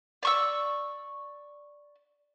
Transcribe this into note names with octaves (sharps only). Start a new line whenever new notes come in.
D5 C#6 E6